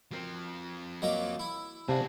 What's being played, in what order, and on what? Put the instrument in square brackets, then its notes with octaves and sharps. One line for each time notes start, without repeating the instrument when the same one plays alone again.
[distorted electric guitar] F3 C4 [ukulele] F#4 A#4 C5
[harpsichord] F#3 A#3 D6 [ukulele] D#5
[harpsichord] E4
[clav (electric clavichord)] C3 [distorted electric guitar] F#4 G#4 [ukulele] D5 F5 A5